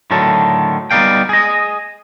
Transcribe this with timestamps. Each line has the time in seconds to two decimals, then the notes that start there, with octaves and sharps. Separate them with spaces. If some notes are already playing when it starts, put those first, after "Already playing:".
0.11 A2 D3 D#3 F#3 A4
0.91 G3 B3 D#4 D5 F5 G5
1.29 G#4 D#5